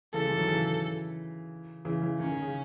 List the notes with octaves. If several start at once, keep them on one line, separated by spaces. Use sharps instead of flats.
C#3 E3 A4
E3 G#3
D#3 F#3
C#3 E3
C#3 E3
C#3 E3
D#3 C#4
D#3
C#3